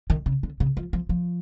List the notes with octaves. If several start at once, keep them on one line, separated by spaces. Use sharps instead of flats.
D#3
C#3
D3
C#3
F3
F3
F3